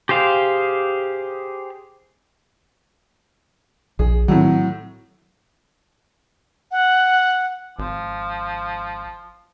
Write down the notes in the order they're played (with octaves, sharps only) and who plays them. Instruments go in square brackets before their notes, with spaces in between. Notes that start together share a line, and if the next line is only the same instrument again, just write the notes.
[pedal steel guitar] G4 G#4 C5 F5
[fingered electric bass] A#1 [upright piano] G#4
[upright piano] A2 F#3 [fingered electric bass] D#3 C4
[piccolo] F#5
[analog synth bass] G#1 [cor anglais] F3